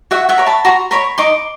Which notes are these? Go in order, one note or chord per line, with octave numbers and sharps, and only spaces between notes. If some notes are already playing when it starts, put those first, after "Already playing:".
F#4 E5 F#5
E5 F#5
A#4 C#5
A5 B5
F#4 A#5 C6
A#4 C#5 B5 C#6
D#4 C6 D6